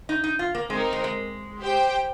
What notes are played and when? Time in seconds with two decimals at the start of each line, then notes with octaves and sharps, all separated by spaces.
0.09 D#4
0.24 D#4
0.39 F4
0.55 A#3
0.70 G#3 C4 D#4 A#4
0.93 G#3
1.04 G#3
1.61 G4 C5 G5